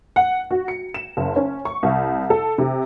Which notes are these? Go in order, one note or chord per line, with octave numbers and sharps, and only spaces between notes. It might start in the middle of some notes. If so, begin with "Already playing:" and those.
F#5
F#4
C#7
E7
F#1
C#4
C#6
C2
A4
C3